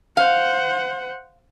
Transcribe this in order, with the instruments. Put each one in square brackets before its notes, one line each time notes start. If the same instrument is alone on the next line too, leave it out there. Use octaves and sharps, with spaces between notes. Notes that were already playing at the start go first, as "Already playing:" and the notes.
[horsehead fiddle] C5 F#5 [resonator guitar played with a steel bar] F5